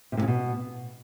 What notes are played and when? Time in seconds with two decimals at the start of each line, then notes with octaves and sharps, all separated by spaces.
0.12 C3
0.17 A2
0.23 C#3
0.28 B2